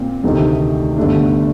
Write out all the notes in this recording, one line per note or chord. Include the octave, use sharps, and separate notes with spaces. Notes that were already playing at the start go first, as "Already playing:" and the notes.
Already playing: A#2 C4
D2 C3 D#3 A3 D#4
G1 G2 D3 A3 D4